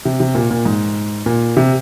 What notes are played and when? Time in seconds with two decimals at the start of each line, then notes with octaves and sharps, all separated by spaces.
0.05 C3
0.20 C3
0.35 A#2
0.51 A#2
0.65 G#2
1.26 A#2
1.57 C3